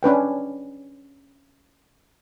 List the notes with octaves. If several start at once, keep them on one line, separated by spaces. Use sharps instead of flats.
C#4 D4 B4 G5